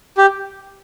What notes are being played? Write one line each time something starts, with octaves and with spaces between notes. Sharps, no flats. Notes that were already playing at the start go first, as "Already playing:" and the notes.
G4